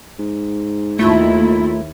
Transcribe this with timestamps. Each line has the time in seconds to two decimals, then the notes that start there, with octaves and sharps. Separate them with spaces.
0.19 G#2
0.99 D#2 A3 E4 F4